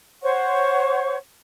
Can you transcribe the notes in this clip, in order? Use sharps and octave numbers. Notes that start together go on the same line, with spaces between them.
C5 C#5 F#5 C#6